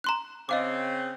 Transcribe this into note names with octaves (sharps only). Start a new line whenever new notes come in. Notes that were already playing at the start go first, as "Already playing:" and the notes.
A#5 C6 F#6
C#3 C4 D#5 F5 D6